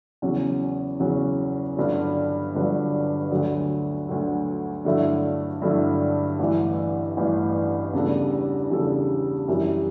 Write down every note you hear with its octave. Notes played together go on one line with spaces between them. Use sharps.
E2 C#3 F#3 C#4
E2 C#3 F#3 C#4
G1 G2 D3 F#3
G1 G2 D3 F#3
D2 D3 F#3
D2 D3 F#3
G2 D3 F#3 A3 E4
G2 D3 F#3 A3 E4
A1 G2 E3
A1 G2 E3
E2 C#3 G3 D4 A4
E2 C#3 G3 D4 A4
F#2 E3 G3